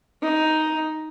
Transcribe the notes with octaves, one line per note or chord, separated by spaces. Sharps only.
D#4